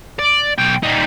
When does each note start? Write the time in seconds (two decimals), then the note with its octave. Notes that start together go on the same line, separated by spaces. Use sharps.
0.19 D5
0.58 B1 G5
0.83 G3 D#4